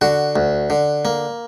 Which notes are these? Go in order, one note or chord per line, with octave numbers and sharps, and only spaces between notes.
D3 F#4
D2
D3
A#3